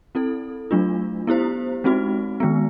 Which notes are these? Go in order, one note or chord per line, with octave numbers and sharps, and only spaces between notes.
C4 E4 A4
F#3 A3 D4 F4
B3 E4 G4 C5
G#3 C4 D#4 F#4
D#3 G#3 B3